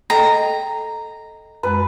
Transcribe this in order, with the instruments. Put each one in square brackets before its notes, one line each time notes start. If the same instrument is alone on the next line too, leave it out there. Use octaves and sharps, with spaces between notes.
[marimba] A4 D#5 G5 [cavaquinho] A#5
[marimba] F#2 G#3 [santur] B4